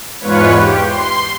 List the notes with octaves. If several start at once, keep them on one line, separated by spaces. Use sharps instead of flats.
E2 G#2 F4 B4 C#5
G4
C6